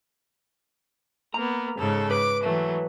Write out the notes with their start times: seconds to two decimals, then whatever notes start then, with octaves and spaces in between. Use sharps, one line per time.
1.34 A#3 B3 A#5
1.78 G#2 C#3 A4
2.11 B4 D6
2.43 E3 F#3 A3